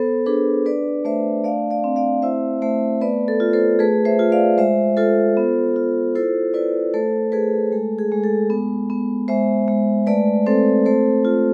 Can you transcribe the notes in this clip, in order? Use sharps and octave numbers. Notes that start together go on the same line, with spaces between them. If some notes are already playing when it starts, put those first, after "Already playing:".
Already playing: B3 A4 C5
D4 G#4 B4
D4 B4 D5
A3 C5 E5
A3 D5 F5
D5 F5
C4
D5 F5
E4 C5 E5
A3 C5 E5
B3 B4 D5
A4
F4
A4 C5
A3 G#4 B4
C5 E5
F4
D5 F5
G#3 C5 E5
F4 A4 C5
B3
F4
E4 A4 C5
E4 B4 D5
A3 A4 C5
A3 G#4 B4
G#3 A4
G#4
G#3
A4
B3
B3
G#3 C5 E5
G#3
A3 B4 D5
C4 A4 C5
A3 A4 C5
F4